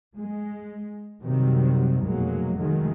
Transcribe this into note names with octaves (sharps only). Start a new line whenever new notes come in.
G#3
F#2 C3 D#3 F#3 G3 C4
F1 B2 F#3 G#3 A#3
D#3 F#3 G#3 A3